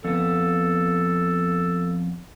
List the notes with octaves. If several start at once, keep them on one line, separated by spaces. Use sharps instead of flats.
F2 B3 A4